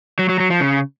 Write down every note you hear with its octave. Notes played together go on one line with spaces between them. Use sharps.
F#3
F#3
F#3
F3
C#3